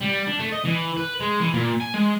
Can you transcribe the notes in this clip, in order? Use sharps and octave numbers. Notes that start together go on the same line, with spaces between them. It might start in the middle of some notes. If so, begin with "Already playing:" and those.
G3
D4
A3
D#5
E3
B4
G#3
E3
A#2
G#5
G#3